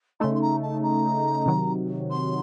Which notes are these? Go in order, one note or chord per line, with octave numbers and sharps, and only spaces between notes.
C#3 A3 D#4 C6
C6
A#5
A5
A#5
C3 D#3 F#3
C6